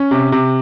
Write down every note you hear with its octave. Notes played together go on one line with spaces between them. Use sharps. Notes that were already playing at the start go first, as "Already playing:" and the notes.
Already playing: C#4
C3
C3